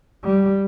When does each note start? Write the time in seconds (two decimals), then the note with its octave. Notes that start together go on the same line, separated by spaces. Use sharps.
0.24 G3